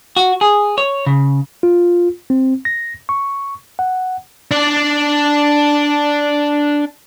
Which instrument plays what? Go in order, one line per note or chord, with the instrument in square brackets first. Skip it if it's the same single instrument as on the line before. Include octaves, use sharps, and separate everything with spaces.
[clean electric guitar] F#4
G#4
C#5
C#3
[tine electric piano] F4
C4
A#6
C#6
F#5
[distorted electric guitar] D4 D5